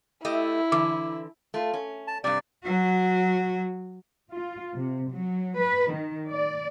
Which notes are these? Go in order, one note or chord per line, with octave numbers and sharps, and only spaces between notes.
A3 E4 G4 D#5
D3 E3 D6
A3 F4
C#4
A5
G2 C3 D5
F#3 F#4
F4
C3
F#3
B4
D#3
D5